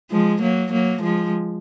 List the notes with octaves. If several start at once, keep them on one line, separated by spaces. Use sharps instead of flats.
F3 G#3
F#3 A#3
F#3 A#3
F3 G#3